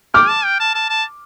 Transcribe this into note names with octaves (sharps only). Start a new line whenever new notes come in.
G5 D6 F6
A5
G5
A5
A5
A5